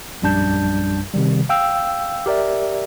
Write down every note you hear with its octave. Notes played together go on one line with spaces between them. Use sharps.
A#1 F#2 G3 D4 A5 G6
C3 D#3 G3
F5 G5 E6
G4 A#4 D5 E5